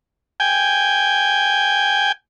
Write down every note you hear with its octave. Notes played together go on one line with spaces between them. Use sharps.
G5 G#5